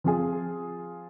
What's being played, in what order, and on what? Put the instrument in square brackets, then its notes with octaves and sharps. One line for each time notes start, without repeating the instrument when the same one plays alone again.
[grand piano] F3 C4 F4 G#4